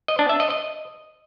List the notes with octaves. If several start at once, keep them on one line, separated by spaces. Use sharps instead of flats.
D#5
D4
E5
D#5
D#5